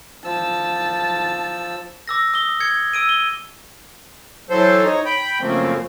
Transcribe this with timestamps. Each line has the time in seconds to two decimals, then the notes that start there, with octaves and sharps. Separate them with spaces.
0.25 F3 A5 E6
2.08 D6 E6 A#6
2.34 D#6 G7
2.60 G#6 C#7
2.93 E6 D7 D#7
3.09 G7
4.50 E3 F#3 A4 C5
4.84 D#4 C#5 A#5
5.05 G5 B5
5.41 F#2 C#3 F3 A3 A#3 C4